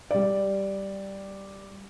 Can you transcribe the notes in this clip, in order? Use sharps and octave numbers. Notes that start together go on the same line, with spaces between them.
G3 D5